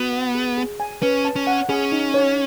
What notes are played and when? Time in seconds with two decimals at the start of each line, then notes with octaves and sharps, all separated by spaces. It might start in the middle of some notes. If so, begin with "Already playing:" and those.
Already playing: B3 F#4
0.13 F#5
0.35 G#4
0.58 G#4
0.80 G#5
1.02 C#4 B4
1.25 A5
1.36 C#4
1.47 F#5
1.69 C#4 G#4
1.92 D#4
2.14 C#5